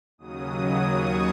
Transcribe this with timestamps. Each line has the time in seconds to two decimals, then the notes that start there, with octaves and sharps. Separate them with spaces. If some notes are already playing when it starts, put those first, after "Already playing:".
0.18 D#2 C#3 F#3 D#6
0.91 C#6